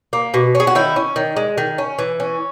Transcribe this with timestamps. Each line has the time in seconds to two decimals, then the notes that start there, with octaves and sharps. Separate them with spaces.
0.13 A#3
0.34 B2
0.55 C#4
0.60 G#4
0.67 F#4
0.75 D#3 E4
0.96 C#4
1.16 D#3
1.36 G#3
1.58 D#3
1.78 C#4
1.99 E3
2.20 C#4